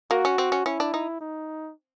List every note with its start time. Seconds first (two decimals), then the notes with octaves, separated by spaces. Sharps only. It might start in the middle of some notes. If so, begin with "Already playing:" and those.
0.11 A#3 F#4
0.25 C#4
0.38 C4
0.52 C#4
0.66 C#4 E4
0.80 D4
0.94 D#4
1.21 D#4